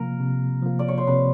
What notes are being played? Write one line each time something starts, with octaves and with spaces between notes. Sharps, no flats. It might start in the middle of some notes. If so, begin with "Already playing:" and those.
Already playing: C3 F3 A#3 A#4
C3
F3 A#3
D5
C#5
C5
C3 B4